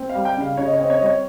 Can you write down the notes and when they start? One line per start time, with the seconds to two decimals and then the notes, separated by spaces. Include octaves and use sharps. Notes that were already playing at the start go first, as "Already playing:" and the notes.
Already playing: C4
0.09 F5
0.15 G3
0.25 G5
0.36 C#3 F5
0.57 C#3 C#5
0.65 D#5
0.74 C#5
0.79 C4 D#5
0.90 C#5
0.97 G3 D#5
1.06 C#5